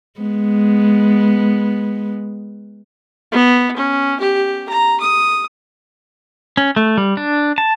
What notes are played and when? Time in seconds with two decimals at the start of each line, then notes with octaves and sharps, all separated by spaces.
0.20 G#3 B3
3.32 B3
3.76 C#4
4.20 G4
4.69 A#5
5.00 D#6
6.57 C#4
6.76 A3
6.98 G3
7.17 D4
7.58 A5